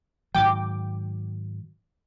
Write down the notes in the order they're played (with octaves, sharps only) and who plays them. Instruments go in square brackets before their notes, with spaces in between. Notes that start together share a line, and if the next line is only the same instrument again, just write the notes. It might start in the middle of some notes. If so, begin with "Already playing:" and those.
[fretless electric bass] G#2 D#3 F#3 [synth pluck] G5 D6